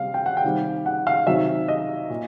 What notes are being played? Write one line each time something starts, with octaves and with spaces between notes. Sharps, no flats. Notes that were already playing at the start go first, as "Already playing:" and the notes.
Already playing: C3 G3 F5
G5
F#5
G5
C3 D#3 G3
F#5
F5
C3 D#3 F#3 E5
D#5
A#2